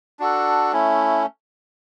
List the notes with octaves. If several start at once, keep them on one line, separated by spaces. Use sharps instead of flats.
D4 F#4 A4
A3 C#4 E4